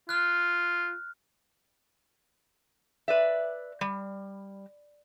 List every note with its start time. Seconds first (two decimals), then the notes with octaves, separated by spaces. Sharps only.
0.09 F4 F6 F#6
3.08 B4 D5 E5
3.81 G3